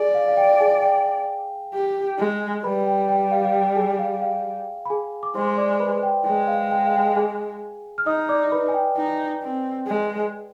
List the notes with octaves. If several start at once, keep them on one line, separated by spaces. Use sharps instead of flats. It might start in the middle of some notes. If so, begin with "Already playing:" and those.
Already playing: G#4 D5 G#5
F5
F5
G5
G#4 G#5
G5
G4
G#3
G3 B4 B5
G5
G5
F5
F5
G5
G#4 G#5
F5
F5
B5
G#4 G#5
D6
G#3 C5 C6
D5 D6
B4 B5
G5
G#3 G5
F5
G5
F5
G5
G#4 G#5
F6
D#4 D#5 D#6
D5 D6
B4 B5
G#5
G5
D#4
C4
G#3